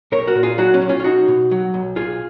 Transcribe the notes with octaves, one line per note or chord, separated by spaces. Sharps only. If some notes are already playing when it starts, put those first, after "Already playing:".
B1 A#4 C#5
F#4 A#4
A#2
F4 G#4
F#3 D#4 F#4
C#4
B1
C#4 F4
F4
B1 D#4 F#4
B2
F#3
B1
B1 F4 G#4